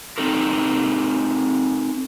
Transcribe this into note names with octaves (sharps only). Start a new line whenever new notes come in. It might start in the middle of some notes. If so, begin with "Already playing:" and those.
C4 D#4 A4 A#4